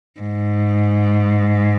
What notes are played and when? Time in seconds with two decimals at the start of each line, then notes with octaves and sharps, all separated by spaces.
0.20 G#2